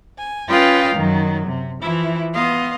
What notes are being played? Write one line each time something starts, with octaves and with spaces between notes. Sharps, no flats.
G#5
C#4 F4 B4 D#5 F5 G5
F#2 D#3 F#3
C3
E3 F3 E4
B3 D#5 F5 C6